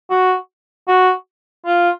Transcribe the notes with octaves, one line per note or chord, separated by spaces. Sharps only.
F#4
F#4
F4